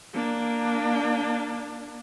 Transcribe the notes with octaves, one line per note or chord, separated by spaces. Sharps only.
A#3 D4